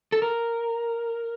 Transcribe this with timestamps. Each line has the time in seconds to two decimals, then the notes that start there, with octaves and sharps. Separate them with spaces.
0.12 A4
0.22 A#4